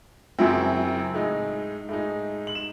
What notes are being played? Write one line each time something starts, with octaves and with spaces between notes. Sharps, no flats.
F#2 C#3 F#3 C4 E4
A2 G#3 D#4
A2 G#3 D#4
F#7
E7